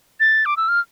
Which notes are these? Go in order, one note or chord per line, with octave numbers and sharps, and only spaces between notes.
A6
D6
E6
F6